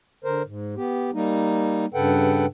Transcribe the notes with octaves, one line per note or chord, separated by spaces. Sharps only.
D3 A#4 C5
G#2
B3 G4
G3 A#3 D#4
G2 C#3 A4 B4 F#5 G5